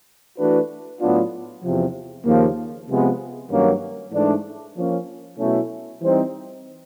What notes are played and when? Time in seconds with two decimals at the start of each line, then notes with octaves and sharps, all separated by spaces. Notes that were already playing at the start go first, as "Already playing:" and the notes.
0.38 E3 A3 D4 F#4 B4
1.01 A2 F#3 B3 D4 F4
1.63 E2 C3 F3
2.26 D#2 C#3 F3 A#3
2.89 C3 F3 G#3 B3
3.51 G2 D#3 F#3 A#3 C#4
4.13 G#2 E3 A3 D4
4.76 F3 A#3 C#4
5.39 B2 F#3 A3 C#4 E4
6.01 E3 G3 C4 D#4